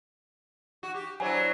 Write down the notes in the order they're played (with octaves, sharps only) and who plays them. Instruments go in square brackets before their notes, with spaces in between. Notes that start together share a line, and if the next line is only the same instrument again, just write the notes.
[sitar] F#4
G4
[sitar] F#3 D4 E4 [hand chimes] C5 G#5